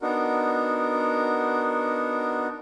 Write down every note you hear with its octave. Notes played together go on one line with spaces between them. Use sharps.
B3 D4 D#4 F#4 A#4